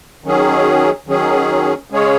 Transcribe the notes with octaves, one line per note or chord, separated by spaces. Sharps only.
D#3 F#3 C#4 G#4
D#3 F#3 C#4 G#4
C#3 G#3 C#4 G#4 C#5